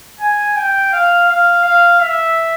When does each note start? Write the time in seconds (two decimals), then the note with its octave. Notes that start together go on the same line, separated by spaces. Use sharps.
0.20 G#5
0.56 G5
0.92 F5
1.28 F5
1.64 F5
2.01 E5